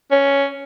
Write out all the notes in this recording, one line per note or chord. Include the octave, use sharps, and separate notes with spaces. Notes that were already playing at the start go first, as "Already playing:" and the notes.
C#4